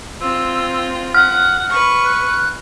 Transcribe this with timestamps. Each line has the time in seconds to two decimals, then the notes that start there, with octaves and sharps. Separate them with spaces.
0.21 C4 F4 E6
1.14 F#5 F6
1.69 B4 C#6
2.05 F#6